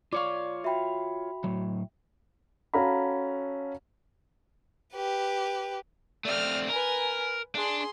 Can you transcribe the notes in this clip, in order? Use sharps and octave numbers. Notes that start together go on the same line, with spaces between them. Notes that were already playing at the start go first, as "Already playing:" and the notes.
F4 C#5 D5 F5 C#6 D6
F#4 E5 G5 B5
A2 F#3
C#4 F#4 A4 F5 A#5 B5
G4 B4
A3 C4 D5 F6
A#4 B4 G#5
D4 G#4 C6